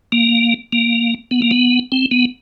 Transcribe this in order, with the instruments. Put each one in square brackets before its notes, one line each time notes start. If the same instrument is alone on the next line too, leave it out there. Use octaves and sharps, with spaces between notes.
[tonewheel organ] A#3
A#3
B3
A#3
B3
C4
B3